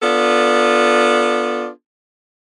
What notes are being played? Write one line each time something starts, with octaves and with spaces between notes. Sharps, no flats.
B3 D4 F4 A4